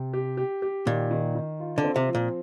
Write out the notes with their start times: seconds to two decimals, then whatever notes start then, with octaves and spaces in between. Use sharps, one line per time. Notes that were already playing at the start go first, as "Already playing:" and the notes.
Already playing: C3
0.13 G4
0.37 G4
0.62 G4
0.86 A#2 D#3
1.11 D#3
1.35 D#3
1.60 F4
1.78 D3
1.84 C4
1.96 C3
2.09 F3
2.15 A#2